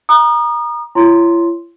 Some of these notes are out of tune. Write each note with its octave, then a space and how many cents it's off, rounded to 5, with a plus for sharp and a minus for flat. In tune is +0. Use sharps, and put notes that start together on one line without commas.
A#5 +25 D#6 -30
E4 +45 C#5 +5 C6 +0